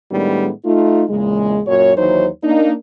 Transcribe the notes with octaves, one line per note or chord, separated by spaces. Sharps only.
A2 D#3 G3 G#3 B3 D4
A3 D#4 F4
E2 A#2 C#3 G#3
F#2 A#2 F#4 C#5
D#2 E3 F#3 D#4 C5 C#5
A#3 D4 D#4